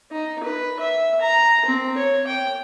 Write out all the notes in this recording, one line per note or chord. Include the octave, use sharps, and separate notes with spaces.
D#4
B4
E5
A#5
C4
C#5
G5